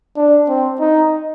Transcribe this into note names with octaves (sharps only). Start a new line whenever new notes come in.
D4
C4
D#4